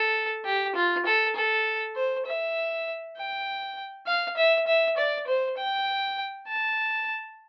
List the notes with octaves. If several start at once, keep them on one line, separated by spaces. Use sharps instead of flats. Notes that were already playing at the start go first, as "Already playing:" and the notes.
Already playing: A4
G4
F4
A4
A4
C5
E5
G5
F5
E5
E5
D5
C5
G5
A5